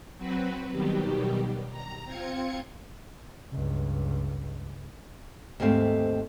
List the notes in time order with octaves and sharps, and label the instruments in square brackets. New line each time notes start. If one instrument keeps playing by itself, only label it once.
[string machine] F#3 C4 F#4 B4
B2 D#3 F#3 G3 G4
A#5
C4 F4 G#6 C#7
[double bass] C#2 G2
[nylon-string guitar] D#2 G#2 A3 C4 F5